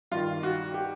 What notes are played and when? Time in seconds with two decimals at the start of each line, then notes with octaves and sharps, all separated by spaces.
0.11 G2 D#3 F4
0.43 F#4
0.74 G4